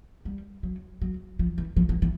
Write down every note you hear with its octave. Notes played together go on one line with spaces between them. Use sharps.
G3
F#3
F#3
F3
E3
F3
E3
E3